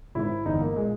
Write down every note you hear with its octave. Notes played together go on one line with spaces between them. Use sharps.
G#1 G#2 D#3 E4
G1 G2 E3 D#4
A#3
A#2 G#3